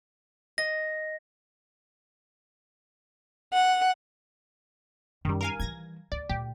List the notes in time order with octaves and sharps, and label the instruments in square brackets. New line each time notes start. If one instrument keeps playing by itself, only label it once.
[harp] D#5 [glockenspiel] A#6
[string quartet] F#5
[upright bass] F#2 [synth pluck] D#3 G3
[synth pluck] A#4 F5 G#5
[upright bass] E3 G3 [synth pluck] G#6 A#6
[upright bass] D2 [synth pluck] D5
[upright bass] D2 A#2 [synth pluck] G4